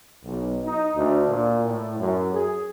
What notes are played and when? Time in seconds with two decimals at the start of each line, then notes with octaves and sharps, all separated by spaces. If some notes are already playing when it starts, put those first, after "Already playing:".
0.23 B1
0.65 D#4
0.95 D2
1.27 A#2
1.64 A2
1.99 F#2
2.33 G#4